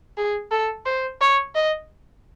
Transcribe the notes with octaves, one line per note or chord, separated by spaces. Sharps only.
G#4
A4
C5
C#5
D#5